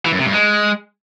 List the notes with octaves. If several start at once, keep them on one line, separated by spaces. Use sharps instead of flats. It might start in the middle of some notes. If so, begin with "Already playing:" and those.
E3
F#2
C3
G2
G#3